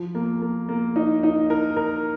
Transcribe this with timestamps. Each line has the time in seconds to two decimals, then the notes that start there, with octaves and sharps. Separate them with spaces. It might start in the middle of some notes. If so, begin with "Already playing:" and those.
Already playing: F3
0.15 A#3
0.42 A#3
0.69 A#3
0.96 D#4
1.23 D#4
1.50 A#4
1.76 A#4